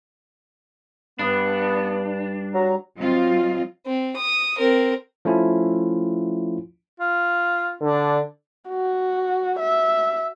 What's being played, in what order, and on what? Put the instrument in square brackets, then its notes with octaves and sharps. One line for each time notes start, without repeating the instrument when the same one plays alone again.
[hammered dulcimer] G2 G3 [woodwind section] B3 [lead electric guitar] D4
[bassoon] F#3 [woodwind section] A#5
[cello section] F#3 C4 F4 D#5
[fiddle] C4
D#6
C4 A#4
[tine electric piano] F3 A3 C#4 E4 F4
[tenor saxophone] F4
[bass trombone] D3 [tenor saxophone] D4
[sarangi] F#4
E5